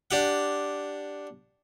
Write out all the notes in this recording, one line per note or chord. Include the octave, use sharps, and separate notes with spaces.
D4 G4 F#5